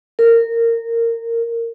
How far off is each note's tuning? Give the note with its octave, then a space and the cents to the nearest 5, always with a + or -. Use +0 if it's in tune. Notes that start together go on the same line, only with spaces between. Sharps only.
A#4 -20